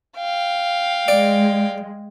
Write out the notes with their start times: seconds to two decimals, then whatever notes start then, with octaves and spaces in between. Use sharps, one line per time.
0.17 F5 G5
1.08 G#3 D5